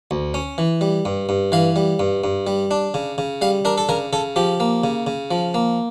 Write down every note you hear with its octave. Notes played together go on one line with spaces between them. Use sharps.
D2
C#4
E3
G3
G2
G2
E3 F5
G3
G2
G2
G3
D4
C#3
C#3
G3 F5
D4 A#4
A4
C#3 A#4
C#3 A4
F3 G4
A#3
C#3
C#3
F3
A#3